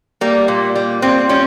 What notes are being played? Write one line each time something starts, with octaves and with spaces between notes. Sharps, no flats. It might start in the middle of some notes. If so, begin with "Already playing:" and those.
G3 A#3
A#2
G3
A#2 C4
G3 C#4